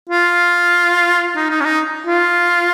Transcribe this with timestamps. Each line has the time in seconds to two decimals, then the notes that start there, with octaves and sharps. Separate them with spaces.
0.10 F4
1.36 D#4
1.50 D#4
1.60 C#4
1.65 D#4
2.07 F4